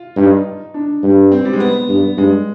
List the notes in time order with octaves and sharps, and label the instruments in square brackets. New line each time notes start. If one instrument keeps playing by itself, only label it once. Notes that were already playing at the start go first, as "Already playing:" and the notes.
Already playing: [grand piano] F4
[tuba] G2 [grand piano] D#4
[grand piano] D4
[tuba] G2
[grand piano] C4
G3
G#3
B3
[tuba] G2
[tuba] G2 [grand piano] G#3